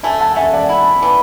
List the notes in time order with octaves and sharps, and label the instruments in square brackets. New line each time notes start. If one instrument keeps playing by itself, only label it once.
[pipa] A3 [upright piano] E5 G#5
[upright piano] F#5 A5
[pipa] A3 [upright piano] E5 G#5
[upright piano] D5 F#5
[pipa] E4
E3